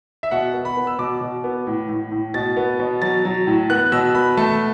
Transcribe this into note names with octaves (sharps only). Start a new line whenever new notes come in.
E5
B2 F#5
B3
B5
B3
E6
B2 D6
B2
B3
A2
A2
A2
B2 A6
B3
B2
F#3 A6
F#3
A2
B3 F#6
B2 E6
B3 B5
A3 A5